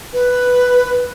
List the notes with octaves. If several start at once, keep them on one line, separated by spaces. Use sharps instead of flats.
B4